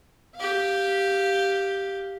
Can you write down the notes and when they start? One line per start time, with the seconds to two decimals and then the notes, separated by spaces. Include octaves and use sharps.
0.36 G4 F5